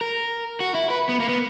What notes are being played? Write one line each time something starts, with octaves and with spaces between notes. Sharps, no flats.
A#4
F#4
E4
B4
B3
A#3
B3